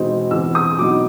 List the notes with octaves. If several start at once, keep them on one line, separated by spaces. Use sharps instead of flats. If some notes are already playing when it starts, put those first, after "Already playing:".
Already playing: E2 B2 G#3 C4 D#4
E2 C3 E3 E6
D#6
B2 F#3 B3 D#4 D6